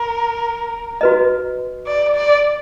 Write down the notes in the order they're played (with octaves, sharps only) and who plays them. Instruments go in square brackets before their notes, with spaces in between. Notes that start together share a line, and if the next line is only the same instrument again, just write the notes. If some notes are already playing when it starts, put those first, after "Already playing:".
Already playing: [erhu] A#4
[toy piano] F#4 B4 D#5
[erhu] D5
D5